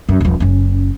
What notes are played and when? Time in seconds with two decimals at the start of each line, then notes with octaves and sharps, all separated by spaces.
0.09 F#2
0.20 D#1 F3
0.40 F#1 C#4